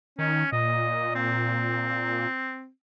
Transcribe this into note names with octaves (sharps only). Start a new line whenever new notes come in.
D#3 C#4
A#2 D#5
C4